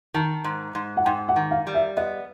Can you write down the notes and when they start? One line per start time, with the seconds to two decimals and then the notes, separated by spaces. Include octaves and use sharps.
0.14 D#3 A5
0.44 G#2
0.75 G#2
0.97 F#5
1.05 G#2 G5
1.29 F#5
1.36 D#3
1.51 F5
1.67 G3
1.74 E5
1.97 B3 D#5